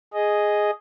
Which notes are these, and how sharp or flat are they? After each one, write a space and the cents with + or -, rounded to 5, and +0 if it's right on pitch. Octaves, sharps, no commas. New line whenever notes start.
G#4 +0 D#5 +0